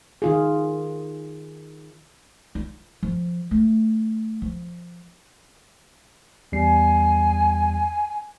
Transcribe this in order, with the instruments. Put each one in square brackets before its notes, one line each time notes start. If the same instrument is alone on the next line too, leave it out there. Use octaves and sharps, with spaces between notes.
[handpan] D#3 F4 G#4
[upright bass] F4
F3
A3
F3
[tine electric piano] E2 G3 C7 [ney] G#5